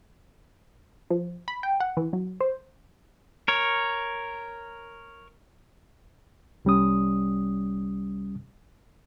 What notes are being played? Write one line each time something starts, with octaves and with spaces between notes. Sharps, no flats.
F3
B5
G5
F#5
E3
F#3
C5
A#4 C#5
C2 G3 C#4 D#6